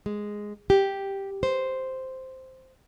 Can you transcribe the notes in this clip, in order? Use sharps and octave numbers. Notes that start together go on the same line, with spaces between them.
G#3
G4
C5